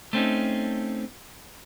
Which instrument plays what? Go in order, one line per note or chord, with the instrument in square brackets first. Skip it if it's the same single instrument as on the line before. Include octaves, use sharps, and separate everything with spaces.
[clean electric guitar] A3 C4 C#4 D#4